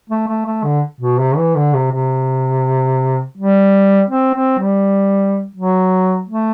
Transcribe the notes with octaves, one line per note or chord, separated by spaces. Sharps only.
A3
A3
A3
D3
B2
C3
E3
D3
C3
C3
G3
C4
C4
G3
F#3
A3